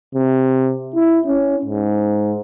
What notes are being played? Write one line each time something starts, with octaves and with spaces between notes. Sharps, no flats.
C3
E4
C#4
G#2